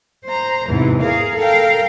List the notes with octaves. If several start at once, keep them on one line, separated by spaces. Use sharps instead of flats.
C5 A#5
E2 G#2 C3 E3
G#4 A#4 F5
A4 A#4 F5 G5